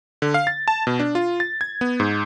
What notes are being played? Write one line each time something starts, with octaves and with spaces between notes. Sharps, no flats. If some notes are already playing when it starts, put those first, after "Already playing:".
D3
F5
A6
A5
B2
D4
F4
A6
G#6
B3
G#2